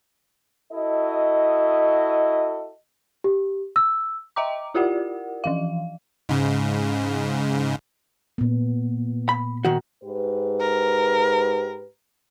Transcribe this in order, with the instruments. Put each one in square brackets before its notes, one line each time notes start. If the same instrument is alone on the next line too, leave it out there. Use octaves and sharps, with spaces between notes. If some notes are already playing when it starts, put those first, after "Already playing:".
[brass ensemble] E4 F#4 A4 D#5
[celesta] G4
E6
[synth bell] D#5 E5 G5 A#5 D6
E4 F4 G4 A#4 D5 F#5
E3 F3 F5
[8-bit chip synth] G#2 C#3
[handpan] A#2 B3
[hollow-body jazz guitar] B5
D#3 F#4
[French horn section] G#2 G4 B4
[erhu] A#4